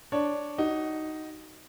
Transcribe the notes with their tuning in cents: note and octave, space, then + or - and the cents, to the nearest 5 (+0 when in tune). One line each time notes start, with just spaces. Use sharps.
D4 +0 C#5 +0
D#4 +0 F#4 +25